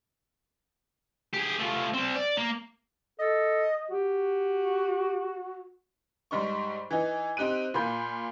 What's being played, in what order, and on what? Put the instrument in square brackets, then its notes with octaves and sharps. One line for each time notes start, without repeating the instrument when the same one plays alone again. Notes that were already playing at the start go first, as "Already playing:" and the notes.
[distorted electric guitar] G4 G#4
F3 A3
G3 C4
D5
A#3
[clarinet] A4 [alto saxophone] D#5
[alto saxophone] F#4 [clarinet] G4
[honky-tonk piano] G#2 G3 D#4 C#6
E3 D#4
C4 D#4 G4 F#6 D#7
A#2 A#3 B5 G6